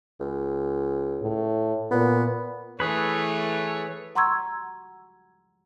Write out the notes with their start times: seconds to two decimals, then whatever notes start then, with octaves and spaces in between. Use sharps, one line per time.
0.20 C#2
1.22 A2
1.91 A#2 B3
2.80 E3 A3 G#4 A4 B4 C#5
4.15 F#5 A#5 C6 C#6 E6 G#6